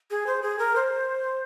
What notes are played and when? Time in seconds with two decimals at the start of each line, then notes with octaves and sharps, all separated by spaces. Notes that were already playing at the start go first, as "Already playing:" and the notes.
0.11 G#4
0.27 C5
0.42 G#4
0.59 A#4
0.76 C5